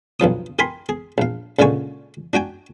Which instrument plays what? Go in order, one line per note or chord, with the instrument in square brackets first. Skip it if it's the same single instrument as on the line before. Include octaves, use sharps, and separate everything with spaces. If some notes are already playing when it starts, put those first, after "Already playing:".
[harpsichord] B1 G2 F3 D#6
G4 A#4 G#5 B5 C6
G#4
A#1 F5
C#2 A#2 D3 G#3 G#5 C#6
D4 F#4 G5 G#5